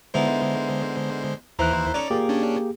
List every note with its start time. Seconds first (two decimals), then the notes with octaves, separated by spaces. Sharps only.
0.14 D3 G#3 B3 D#4 E4 C5
1.59 D#2 E3 E4 C5 A#5 F#6
1.94 C#4 D#4 A4 D5
2.10 A#2 A#3 G4 G#4
2.29 C#4 D4